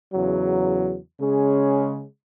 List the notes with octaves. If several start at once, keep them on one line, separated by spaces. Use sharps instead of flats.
E2 C#3 F#3
C#3 G#3 C#4 G#4